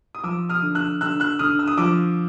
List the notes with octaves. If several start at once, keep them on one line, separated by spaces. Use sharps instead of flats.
D#6
F3 D6 E6
D#6 F6
D3
E6 F#6
D3 E6 F#6
E6 F#6
D3 D#6 F6
E6
D#6
F3 D6 E6